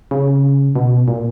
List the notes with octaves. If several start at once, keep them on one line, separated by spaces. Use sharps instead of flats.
C#3
B2
A#2